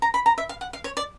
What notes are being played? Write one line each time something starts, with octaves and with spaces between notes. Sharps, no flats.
A#5
B5
A#5
E5
F5
F#5
F5
C#5
D5